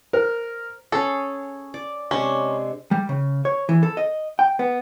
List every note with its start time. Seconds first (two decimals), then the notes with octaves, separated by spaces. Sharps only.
0.13 A#4 C5
0.92 C#4 G#4 A4
1.74 D5
2.11 C3 G#3 C#4 D4
2.91 G3
3.09 C#3
3.45 C#5
3.69 E3
3.83 A4
3.97 D#5
4.39 G5
4.59 B3